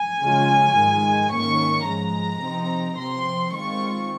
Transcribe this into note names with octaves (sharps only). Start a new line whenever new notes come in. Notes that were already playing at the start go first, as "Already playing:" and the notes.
Already playing: G#5
C#3 G#3 C#4 F4
G#2 D#3 G#3
G#2 D#3 A#3 C#4 C#6
G#2 F3 G#3 A#5
C3 F3 C4 D#4
C3 F3 C4 C6
D#3 G#3 C4 F4 C#6